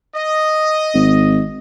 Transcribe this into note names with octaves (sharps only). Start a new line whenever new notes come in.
D#5
G#1